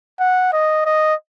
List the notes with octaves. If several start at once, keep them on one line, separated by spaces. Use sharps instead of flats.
F#5
D#5
D#5